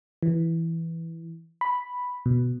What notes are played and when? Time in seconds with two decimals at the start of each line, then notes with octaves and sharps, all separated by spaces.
0.23 E3
1.61 B5
2.26 B2